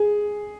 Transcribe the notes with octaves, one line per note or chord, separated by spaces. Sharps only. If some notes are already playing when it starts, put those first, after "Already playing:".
Already playing: G#4